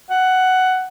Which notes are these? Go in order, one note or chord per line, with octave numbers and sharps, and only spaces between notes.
F#5